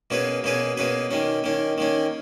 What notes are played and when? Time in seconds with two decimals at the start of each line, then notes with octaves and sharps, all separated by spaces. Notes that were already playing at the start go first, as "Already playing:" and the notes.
0.10 B2 A#3 C#4 G#4 B4
0.44 B2 A#3 C#4 G#4 B4
0.77 B2 A#3 C#4 G#4 B4
1.11 D#3 A#3 C#4
1.44 D#3 A#3 C#4
1.78 D#3 A#3 C#4